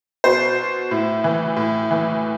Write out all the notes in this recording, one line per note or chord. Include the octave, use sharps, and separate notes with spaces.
B2 C5
A2
E3
A2
E3